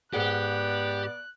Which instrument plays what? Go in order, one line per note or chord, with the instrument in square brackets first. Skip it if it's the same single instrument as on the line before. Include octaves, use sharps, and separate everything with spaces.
[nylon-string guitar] G#2 G#4 F#5 [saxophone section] B3 D5 [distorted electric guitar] G4 [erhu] F#6